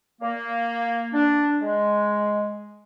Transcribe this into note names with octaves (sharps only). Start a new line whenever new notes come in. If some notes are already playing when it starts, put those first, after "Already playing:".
A#3
D4
G#3